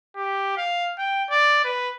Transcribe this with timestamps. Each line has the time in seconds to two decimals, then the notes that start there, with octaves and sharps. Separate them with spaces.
0.17 G4
0.57 F5
0.98 G5
1.30 D5
1.65 B4